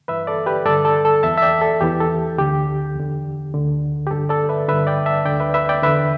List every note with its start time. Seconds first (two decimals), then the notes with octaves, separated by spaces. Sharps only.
0.08 G2 E3 B4 E5
0.27 A4 D5
0.46 G4 B4
0.65 G2 D3 A4 D5
0.85 A4
1.05 A4
1.23 E2 E3 E5 A5
1.37 E5
1.42 D5 G5
1.62 A4
1.81 E2 E3 G4
2.00 A4
2.38 D2 D3 G4
2.95 E2 D3
3.54 D2 D3
4.07 G4
4.11 G2 D3 A4
4.29 A4 D5
4.49 B4 E5
4.68 G2 D3 B4 E5
4.87 D5 G5
5.06 E5 A5
5.25 D2 D3 D5 G5
5.40 B4 E5
5.54 B4 E5
5.69 D5 G5
5.83 E2 D3 B4 E5